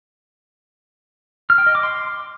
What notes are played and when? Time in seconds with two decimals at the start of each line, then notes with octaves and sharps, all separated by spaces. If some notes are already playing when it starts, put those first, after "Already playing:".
1.50 F6
1.58 G5
1.67 D#5
1.75 D6
1.83 C6